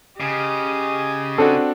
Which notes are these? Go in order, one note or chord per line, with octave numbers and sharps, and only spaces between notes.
C#3 G4 D#5
C4 D4 F#4 A4